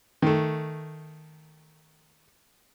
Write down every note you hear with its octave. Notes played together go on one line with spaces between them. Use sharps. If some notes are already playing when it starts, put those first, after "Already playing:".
D#3 A3